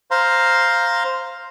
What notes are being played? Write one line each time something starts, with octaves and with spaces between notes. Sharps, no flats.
C5 F5 A#5 C6